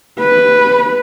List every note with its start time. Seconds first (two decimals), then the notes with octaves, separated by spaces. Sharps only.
0.19 B4